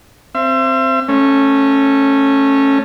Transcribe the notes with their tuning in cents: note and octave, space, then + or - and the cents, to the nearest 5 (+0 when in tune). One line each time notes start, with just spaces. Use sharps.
C4 +0 E5 +40
A3 +0 C#4 -15